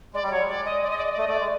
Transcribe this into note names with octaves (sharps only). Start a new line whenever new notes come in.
G#3 D5
G3
D5
F#3 C#5
G#3
D5
D#5
D5
D#5
D5
D#5
D5
A3
D#5
A3 D5
G#3